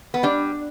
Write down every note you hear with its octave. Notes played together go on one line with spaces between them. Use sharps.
B3
G3 D4